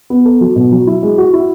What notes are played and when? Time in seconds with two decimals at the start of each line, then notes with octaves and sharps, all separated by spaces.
0.10 B3
0.25 A4
0.41 F#3
0.56 B2
0.72 F#3
0.87 E4
1.03 G#3
1.18 F#4
1.33 E4